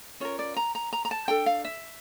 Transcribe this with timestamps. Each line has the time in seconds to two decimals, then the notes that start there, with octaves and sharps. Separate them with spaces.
0.20 C#4 F4 A#4 C#5
0.39 D5
0.57 A#5
0.75 A#5
0.93 A#5
1.05 A#5
1.11 A5
1.28 D4 A4 G5
1.46 F5
1.65 E5